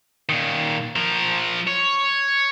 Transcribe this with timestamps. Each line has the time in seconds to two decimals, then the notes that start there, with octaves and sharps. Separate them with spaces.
0.29 A#2 D#3
0.96 F3 A#4
1.67 C#5